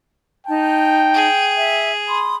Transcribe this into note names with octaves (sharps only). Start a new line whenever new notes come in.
D#4 G5 A5
G#4
E5
B5 C6 D#6